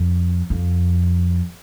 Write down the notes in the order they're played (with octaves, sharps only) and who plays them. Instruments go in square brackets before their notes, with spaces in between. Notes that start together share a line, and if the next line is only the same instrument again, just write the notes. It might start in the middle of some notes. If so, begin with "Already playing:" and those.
Already playing: [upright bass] F2
F2